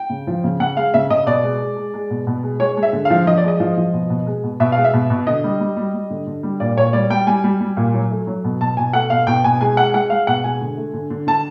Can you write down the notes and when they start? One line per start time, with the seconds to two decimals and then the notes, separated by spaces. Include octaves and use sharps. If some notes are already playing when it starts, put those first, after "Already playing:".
Already playing: G5
0.10 C#3
0.27 F3
0.44 C#3
0.60 C#3 F#5
0.77 G#3 F5
0.94 C#3 E5
1.10 C#3 D#5
1.26 B2 D5
1.43 G#3
1.60 G#3
1.77 G#3
1.94 G#3
2.10 B2
2.27 B2
2.43 G#3
2.60 G#3 C#5
2.77 G#3
2.83 E5
2.93 D3
3.05 F5
3.10 F3
3.26 F3 D#5
3.37 D5
3.44 G#3 D#5
3.60 F3
3.77 F3
3.93 B2
4.10 B2
4.27 G#3
4.44 B2
4.60 B2 E5
4.72 G#3 F5
4.84 E5
4.93 B2
5.10 B2
5.27 D3 D#5
5.44 G3
5.61 G3
5.77 G3
5.94 G3
6.10 D3
6.27 D3
6.43 G3
6.60 A#2 D5
6.77 A#2 C#5
6.93 G3 D5
7.10 G3 G5
7.27 G3 G#5
7.44 G3
7.60 G3
7.77 A#2
7.94 F#3
8.11 A3
8.27 F#3
8.44 B2
8.61 B2 A5
8.77 B2 G#5
8.93 A3 F#5
9.10 B2 F5
9.27 B2 G5
9.44 B2 G#5
9.60 G#3 G#5
9.77 G#3 F#5
9.94 G#3 F#5
10.10 G#3 F5
10.27 B2 F#5
10.44 G#3 G#5
10.61 D3
10.77 A3
10.94 D3
11.10 D3
11.27 D3 A5